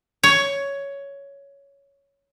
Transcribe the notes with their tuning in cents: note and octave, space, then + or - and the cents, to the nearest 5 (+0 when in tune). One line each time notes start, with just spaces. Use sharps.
C#5 +10